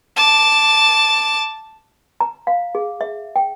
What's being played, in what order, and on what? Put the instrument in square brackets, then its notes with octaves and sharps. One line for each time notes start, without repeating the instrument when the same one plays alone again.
[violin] A5 D6
[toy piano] A#5
F5
G#4
E5
G5